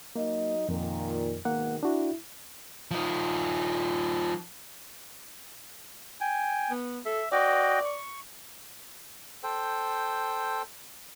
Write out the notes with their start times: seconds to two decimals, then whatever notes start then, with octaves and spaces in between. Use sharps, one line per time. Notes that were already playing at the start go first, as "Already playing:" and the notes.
0.16 F#3 A#3 D#4 D#5
0.69 F2 A#2 D#3
1.45 G#2 B2 D#3 A#3 F#5
1.83 D4 E4 F#4
2.91 F3 D#4
6.21 G5 G#5
6.70 B3
7.06 A4 E5
7.32 F#4 D5 D#5 G5
7.85 C#6
9.43 A4 C5 G5